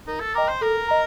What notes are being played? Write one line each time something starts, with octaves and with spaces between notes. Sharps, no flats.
D#4 A#4
A4
A#4 D#5 G5 A#5 D6
C5
A4 A#4
D#5 A#5